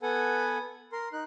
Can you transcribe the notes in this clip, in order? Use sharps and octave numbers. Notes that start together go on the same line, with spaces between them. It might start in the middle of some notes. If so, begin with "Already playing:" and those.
B3 A4 B4 F#5 G#5
A#4 C6
D#4 F#6